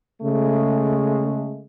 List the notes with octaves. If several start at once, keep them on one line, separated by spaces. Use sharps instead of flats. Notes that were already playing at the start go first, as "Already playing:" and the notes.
C#3 G#3 A3